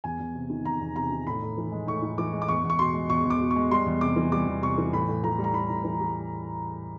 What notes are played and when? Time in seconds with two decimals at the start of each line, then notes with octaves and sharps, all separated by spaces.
0.04 E2 G#5
0.20 E2
0.35 C3
0.50 D#3
0.65 E2 A#5
0.81 E2
0.96 C3 A#5
1.11 D#3
1.27 A2 B5
1.42 A2
1.57 E3
1.72 G#3
1.87 A2 C#6
2.02 A2
2.18 E3 D6
2.33 G#3
2.42 D6
2.48 E2 C#6
2.64 E2
2.70 C#6
2.79 B2 C6
2.94 G#3
3.10 E2 C#6
3.25 E2
3.30 D6
3.40 B2
3.51 C#6
3.56 G#3
3.71 G3 C6
3.86 E2
4.01 C3 D6
4.16 E3
4.32 G3 D6
4.47 E2
4.62 C3 C#6
4.78 E3
4.93 A2 B5
5.08 A2
5.23 E3 A#5
5.38 G3
5.44 A#5
5.54 A2 B5
5.70 A2
5.84 E3
6.00 G3